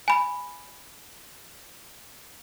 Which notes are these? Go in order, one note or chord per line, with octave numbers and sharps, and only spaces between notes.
G#5 B5